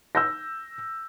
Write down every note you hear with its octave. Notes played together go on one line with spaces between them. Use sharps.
E6 G6 A#6